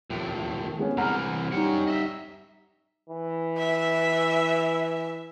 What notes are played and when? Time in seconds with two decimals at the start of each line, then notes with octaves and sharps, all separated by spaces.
0.10 D#2 A2 F3
0.79 G#3 B3 C#4
0.97 C2 E3 F#5 A#5 F6
1.52 G3 C#4 D#4 F#5
1.88 D#5 E5
3.09 E3
3.58 E5